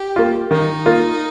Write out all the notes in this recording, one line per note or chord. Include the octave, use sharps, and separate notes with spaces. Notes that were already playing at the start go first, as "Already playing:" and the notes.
Already playing: G4
A#3 F4
D#3 D#4
A#3 F4